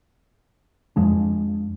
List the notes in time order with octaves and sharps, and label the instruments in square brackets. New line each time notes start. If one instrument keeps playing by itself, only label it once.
[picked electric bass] F2 F3 G#3 D4